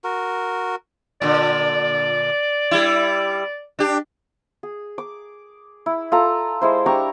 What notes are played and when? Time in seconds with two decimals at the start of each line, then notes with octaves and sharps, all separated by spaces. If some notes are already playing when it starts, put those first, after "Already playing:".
0.04 F#4 A#4
1.22 A#2 D3 D5
2.71 G3 E4
3.79 D4 G4
4.63 G#4
4.98 D6
5.86 E4
6.12 F4 A4 A#5
6.61 G#3 E4 C5
6.86 D4 G4 A#5 C#6